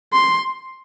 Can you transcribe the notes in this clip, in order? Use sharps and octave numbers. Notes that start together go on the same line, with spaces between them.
C6